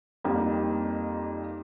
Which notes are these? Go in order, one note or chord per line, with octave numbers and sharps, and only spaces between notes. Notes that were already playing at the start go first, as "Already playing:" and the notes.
F2 G3 A#3 D#4